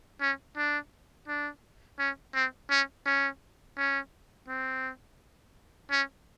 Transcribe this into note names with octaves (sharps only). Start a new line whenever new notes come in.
C#4
D4
D4
C#4
C4
C#4
C#4
C#4
C4
C#4